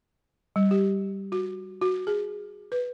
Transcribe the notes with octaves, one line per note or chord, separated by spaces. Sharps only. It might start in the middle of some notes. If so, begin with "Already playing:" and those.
G3
G4
F#4
F#4
G#4
B4